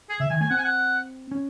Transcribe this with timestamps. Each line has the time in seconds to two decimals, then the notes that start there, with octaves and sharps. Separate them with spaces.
0.10 G#4
0.20 C#3 E5
0.30 D#3 G#5
0.41 A3 G#5
0.50 C4 F#5
0.58 G#5
0.65 F#5
1.31 C#4